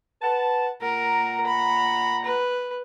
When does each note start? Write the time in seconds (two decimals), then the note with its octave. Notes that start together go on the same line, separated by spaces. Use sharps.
0.22 B4 F#5 A5
0.82 A#2 A#4 F#5 A#5
1.47 B5
2.25 B4